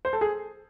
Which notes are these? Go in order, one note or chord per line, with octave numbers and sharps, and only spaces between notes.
C5
A4
G#4